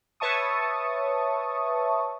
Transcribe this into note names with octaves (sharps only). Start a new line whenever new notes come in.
B4 C#5 E5 A5 C#6 D#6